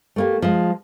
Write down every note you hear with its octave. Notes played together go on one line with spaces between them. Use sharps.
A3 A#3 G4
F3 G#3